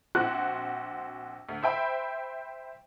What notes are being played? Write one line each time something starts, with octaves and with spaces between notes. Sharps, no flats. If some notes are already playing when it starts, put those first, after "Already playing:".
A#1 C4 F#4 F#6
D2
C5 E5 G5 B5